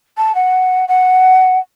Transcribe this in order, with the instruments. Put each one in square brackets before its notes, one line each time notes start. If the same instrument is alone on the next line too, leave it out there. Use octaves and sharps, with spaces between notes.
[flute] A5
F#5
F#5